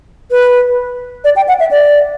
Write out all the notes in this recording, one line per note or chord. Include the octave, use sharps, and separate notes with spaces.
B4
D5
G5
F#5
E5
D5